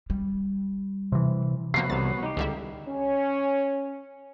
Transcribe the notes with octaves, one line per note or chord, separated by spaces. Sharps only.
G3
C3 E3
C3 F3 A#3 B3 F#4 C#5 C7
C2 C3 A6
D#4 G4
C#2 D3 G3 E4
C#4